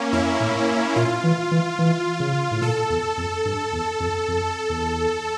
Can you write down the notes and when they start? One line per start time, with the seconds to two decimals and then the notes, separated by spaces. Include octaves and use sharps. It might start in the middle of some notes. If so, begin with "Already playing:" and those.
Already playing: A#3 C#4
0.13 F2 E4
0.40 A2
0.96 A#2 F4
1.24 E3
1.51 E3
1.79 E3
2.20 C#3
2.51 A2
2.62 A#2 A4
2.90 E2
3.17 F2
3.45 G2
3.73 E2
4.00 F2
4.28 F2
4.70 E2